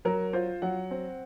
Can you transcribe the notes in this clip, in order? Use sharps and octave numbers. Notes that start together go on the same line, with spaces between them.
F#3 A#4
F4 C5
F#3 F#5
C4